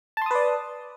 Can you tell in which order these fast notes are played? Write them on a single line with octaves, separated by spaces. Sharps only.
A5 C6 D#6 B4 D5